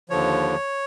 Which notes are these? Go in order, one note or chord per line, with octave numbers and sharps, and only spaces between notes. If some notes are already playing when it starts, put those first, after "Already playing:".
D#2 D3 F3 C#5